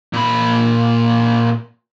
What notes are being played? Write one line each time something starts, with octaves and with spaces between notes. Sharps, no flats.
A#2 B5